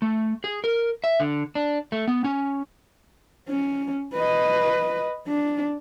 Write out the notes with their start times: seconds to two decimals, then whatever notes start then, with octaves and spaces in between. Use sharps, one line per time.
0.02 A3
0.44 G#4
0.64 A#4
1.04 E5
1.20 D3
1.55 D4
1.92 A3
2.08 B3
2.24 C#4
3.49 C#4
4.14 B4 D#5
5.27 D4